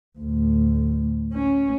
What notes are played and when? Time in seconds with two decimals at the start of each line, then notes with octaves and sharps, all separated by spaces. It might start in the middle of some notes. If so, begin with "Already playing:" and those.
0.19 D2 A2
1.34 C#4